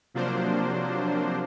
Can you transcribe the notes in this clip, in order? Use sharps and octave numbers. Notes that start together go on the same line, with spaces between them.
C3 F3 F#3 A#3 D4 C5